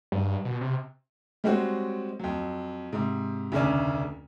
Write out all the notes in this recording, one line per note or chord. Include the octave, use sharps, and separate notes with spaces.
G2
B2
C3
G3 G#3 C4 F#4 C#5
F2 F#3
G#2 C3
F1 D2 C#3 C#4 D4